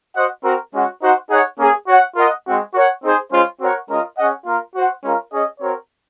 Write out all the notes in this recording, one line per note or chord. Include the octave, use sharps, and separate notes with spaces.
F#4 C5 D#5 F#5
C4 F#4 A#4
G#3 C#4 F#4
D#4 F#4 C5 F#5
D#4 G#4 C#5 F#5
A#3 C#4 G#4
F#4 C#5 F#5
F4 A#4 D#5 F#5
G#3 C4 F#4
F#4 A#4 C#5 F#5
C4 D#4 G#4 C5
G#3 C#4 F4 C5
C4 F#4 A#4 C#5 F#5
G#3 C#4 F4 A#4 D#5
C#4 G#4 D#5 F#5
A#3 F4 A#4 F5
F#4 C5 F#5
G#3 C#4 F4 A#4 F5
C#4 G#4 D#5
C4 F#4 A#4 C#5